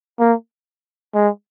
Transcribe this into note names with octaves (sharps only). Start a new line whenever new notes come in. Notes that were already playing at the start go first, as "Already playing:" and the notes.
A#3
G#3